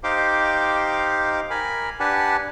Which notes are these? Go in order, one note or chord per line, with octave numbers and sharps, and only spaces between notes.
D#4 G4 C5 F5 G5 D6
A#4 G#5 B5
D4 G4 B4 F#5 G#5 A5